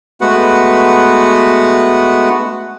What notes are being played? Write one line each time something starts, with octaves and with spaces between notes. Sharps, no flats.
G#3 A3 B3 F#4 B4 F#5